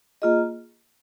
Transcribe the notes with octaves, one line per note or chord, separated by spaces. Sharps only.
A#3 F4 G#4 D#5